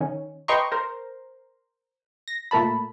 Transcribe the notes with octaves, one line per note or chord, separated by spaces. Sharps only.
D#3 C#4
B4 D#5 G5 A#5 C6 C#6
A#4 C5
A#6
A#2 A3 A#4 A5 B5